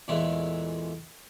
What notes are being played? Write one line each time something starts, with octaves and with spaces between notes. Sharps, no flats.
E2 A#2 E3 G#3 A3